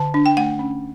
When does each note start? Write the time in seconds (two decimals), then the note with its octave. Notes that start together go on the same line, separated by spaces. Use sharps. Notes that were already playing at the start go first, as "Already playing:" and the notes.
Already playing: D3 A5
0.14 D4
0.26 G5
0.37 A3 F#5
0.59 C#4